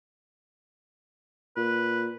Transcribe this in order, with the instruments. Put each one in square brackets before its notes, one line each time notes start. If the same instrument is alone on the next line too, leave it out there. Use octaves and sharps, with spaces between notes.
[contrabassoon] A#2 [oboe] B4